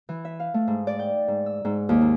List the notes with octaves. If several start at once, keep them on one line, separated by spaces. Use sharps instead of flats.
E3
E5
F5
A3
G#2
D5
G5
G#2
E6
G#2
D#2
G#2